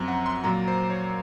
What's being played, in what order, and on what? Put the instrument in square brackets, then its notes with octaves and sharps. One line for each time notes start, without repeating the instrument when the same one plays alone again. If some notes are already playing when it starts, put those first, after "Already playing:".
Already playing: [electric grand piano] F#2 F3 C4 A#5
F#5
C6
A#2 F#3 A#3 A#5
C5
C#5